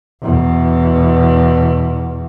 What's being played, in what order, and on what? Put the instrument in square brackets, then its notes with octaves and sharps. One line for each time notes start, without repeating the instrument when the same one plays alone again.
[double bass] E2 B2